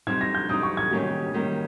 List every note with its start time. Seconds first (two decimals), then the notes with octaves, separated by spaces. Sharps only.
0.07 G3 C4 D#4 G#6
0.21 A#6
0.35 G6
0.49 G3 C4 D#4 D#6
0.63 C#6
0.77 G#6
0.91 D#3 G3 A#3 C#4 G4
1.34 D#3 G3 A#3 C#4 G4